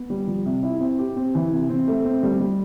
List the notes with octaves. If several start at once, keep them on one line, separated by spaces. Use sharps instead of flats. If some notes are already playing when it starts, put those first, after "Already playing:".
Already playing: B3
G3
F3
C3
E4
C4
G4
C4
E3
C3
C4
A3
C4
G3
G3